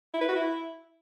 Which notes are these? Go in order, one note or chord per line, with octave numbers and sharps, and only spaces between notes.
E4
B4
F#4
E4